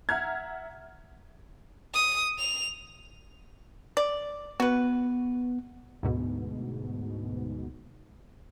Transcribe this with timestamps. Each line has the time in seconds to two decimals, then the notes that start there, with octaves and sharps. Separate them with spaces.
0.09 E5 F#5 A#5 F6 G#6
1.94 D#6
2.38 F7
3.97 D5
4.60 B3 F#4 B4
6.03 D2 G#2 B2